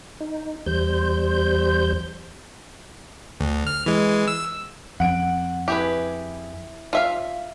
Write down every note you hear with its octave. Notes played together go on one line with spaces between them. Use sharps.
D#4
E2 G3 C5 G6
D2
F6
E3 G#3
E6
F2 F#5 D7
E4 G4 G#4 B4
F4 E5 F5